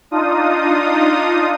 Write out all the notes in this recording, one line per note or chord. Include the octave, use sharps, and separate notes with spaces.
D4 D#4 F4 D#6